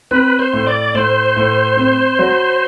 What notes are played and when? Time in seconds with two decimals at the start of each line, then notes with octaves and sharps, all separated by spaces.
0.11 C4 B4
0.39 C5
0.53 A2
0.67 D5
0.94 A2 C5
1.36 A2
1.77 C4
2.19 F#3